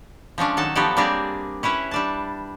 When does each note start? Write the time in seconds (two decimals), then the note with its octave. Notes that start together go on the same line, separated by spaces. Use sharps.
0.38 F3 G#3 C#4 D4
0.57 D#3 F#3 A4 A5
0.75 F3 F#3 B3 G4 A4 D5
0.97 G3 A#3 C4 D4 G4 G#4
1.63 C#4 E4 B4 C#5
1.91 G3 D4 A5